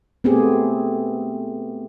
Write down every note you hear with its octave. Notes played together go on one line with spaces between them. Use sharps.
A3 B3 C4 G4 G#4